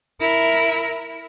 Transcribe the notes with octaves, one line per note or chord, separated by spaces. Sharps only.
E4 A#4